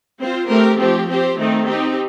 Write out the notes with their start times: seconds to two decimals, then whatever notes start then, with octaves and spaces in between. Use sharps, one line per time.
0.20 C4 F4 C5
0.48 A3 C4 G4 A#4
0.78 F3 A3 C4 G4
1.08 C4 G4 C5
1.37 D#3 A3 C4 D#4
1.67 C4 D#4 G4